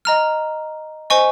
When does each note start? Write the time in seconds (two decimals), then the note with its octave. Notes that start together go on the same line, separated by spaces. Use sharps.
0.05 D#5 A#5 F6
1.10 C5 D#5 G#5 C#6